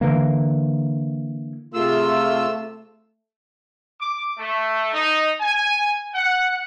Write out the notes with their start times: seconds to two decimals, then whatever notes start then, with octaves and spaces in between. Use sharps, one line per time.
0.01 D3 E3 A#3
1.74 C3 A3 F4 G#4 E6
4.01 D6
4.37 A3
4.93 D#4
5.40 G#5
6.13 F#5